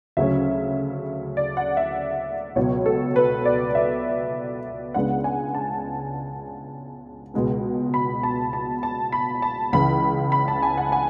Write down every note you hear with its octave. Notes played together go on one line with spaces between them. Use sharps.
D2 C#3 F#3 C#4 E5
D5
F#5
E5
C#2 B2 F#3 C#5
A4
B4
D5
E5
C#2 C#3 G#3 B3 D4 F#5
G#5
A5
C#2 B2 G#3 B3
B5
A5
A5
A5
B5
A5
C#2 C#3 E3 B5
B5
A5
G#5
F#5
G#5